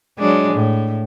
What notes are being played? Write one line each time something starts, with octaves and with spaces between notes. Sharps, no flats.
F#3 G#3 D4
A2